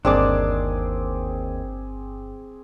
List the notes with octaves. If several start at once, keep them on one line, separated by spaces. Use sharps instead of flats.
G1 D#2 G3 C4 D4 G#4 D6